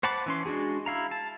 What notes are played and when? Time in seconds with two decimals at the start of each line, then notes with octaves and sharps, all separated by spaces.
0.03 C5 F#5 A5 B5 D6
0.26 E3 C#4 C6
0.46 G#3 D4 F#4 G#4
0.86 E4 F5 A#5
1.11 A5